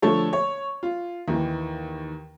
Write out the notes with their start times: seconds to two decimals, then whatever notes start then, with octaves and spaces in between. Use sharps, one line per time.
0.02 D3 F3 A3 A4 C#5
0.33 C#5
0.83 F4
1.28 D#2 D#3 E3